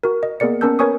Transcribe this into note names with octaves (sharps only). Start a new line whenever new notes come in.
F#4 A#4
D#5
A#3 B3 G#4 A#4 D5 C#7
B3 C#4 A#4 A5 E6 G6
A#4 B4 C#5 G#5 C#6 D#6